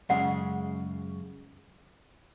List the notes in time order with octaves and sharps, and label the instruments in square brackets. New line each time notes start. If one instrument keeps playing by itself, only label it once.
[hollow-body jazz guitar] F#2 C#3 G#3 [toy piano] F#5